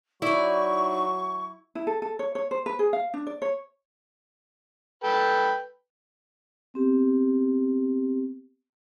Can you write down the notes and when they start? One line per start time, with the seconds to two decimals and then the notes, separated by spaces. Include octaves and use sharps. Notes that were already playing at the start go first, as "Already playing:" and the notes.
0.22 F#3 D#4 E4 D5 C#6
1.75 E4
1.87 A4
2.02 A4
2.19 C#5
2.35 C#5
2.51 C5
2.66 B4
2.79 G#4
2.93 F5
3.14 D4
3.27 D5
3.42 C#5
5.04 A4 B4 G5
6.74 B3 C4 G4